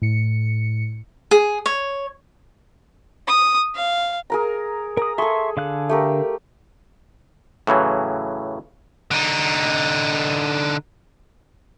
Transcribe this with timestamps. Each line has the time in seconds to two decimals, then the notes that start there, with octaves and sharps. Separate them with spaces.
0.02 A2 C#7
1.31 G#4
1.66 C#5
3.28 D#6
3.75 F5
4.30 G#4 A#4 A#5
4.97 A#4 A#5 D#6
5.18 G#4 A4 E5 C6 C#6
5.57 D3 F5 F#6
5.89 A3 G4 A#4
7.67 A2 C#3 E3 F#3
9.11 D3 D#4